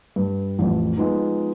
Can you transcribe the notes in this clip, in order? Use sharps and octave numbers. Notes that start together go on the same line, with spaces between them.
G2
A1 F2
F3 G#3 B3 D#4